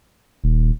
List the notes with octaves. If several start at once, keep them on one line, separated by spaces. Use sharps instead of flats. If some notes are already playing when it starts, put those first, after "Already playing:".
D#1